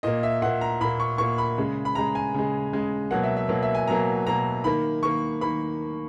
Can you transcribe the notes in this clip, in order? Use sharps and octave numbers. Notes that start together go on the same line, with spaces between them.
A#2 A#3 D#5
E5
A#2 A#3 F#5
A#5
A#2 A#3 B5
C#6
A#2 A#3 C#6
B5
C#3 G#3
B5
C#3 G#3 A#5
G#5
C#3 G#3
C#3 G#3
B2 F#3 A#3 F#5
E5
E5
B2 F#3 A#3
E5
G#5
B2 F#3 A#3 A#5
B2 F#3 A#3 A#5
D#3 A#3 B5
D#3 A#3 C#6
D#3 A#3 B5